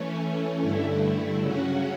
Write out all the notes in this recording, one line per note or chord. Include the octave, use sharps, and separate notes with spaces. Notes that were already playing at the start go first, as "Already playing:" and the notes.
Already playing: E3 A3 C#4
G2 D3 A3 E4
C#3 F#3 C#4 F#4